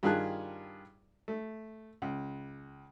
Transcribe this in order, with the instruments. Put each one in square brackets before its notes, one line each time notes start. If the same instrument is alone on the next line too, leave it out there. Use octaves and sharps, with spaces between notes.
[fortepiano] G2 D#3 F4 G#4 A5 F#6
A3
C#2